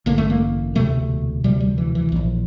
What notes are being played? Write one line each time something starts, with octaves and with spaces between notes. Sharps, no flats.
A1 G2 D3 A#3
A3
A#3
E1 D2 C3 A3
E1 D2 C3 G3
G3
E3
E3
A#1 A2